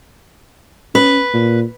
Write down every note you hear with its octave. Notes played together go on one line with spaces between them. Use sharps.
C#4 B4
A#2